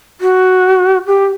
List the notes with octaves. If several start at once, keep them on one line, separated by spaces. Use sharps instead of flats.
F#4
G4